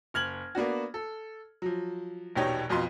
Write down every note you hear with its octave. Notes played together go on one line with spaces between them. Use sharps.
F#1 F6 G#6 F#7
A#3 B3 D4 F#4
A4
F3 F#3
E1 A#1 B2 D#4 G4 C#5
B1 F2 B2 F4 C6